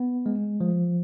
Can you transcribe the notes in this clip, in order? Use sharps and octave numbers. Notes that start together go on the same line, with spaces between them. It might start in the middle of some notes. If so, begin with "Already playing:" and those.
Already playing: B3
G#3
F3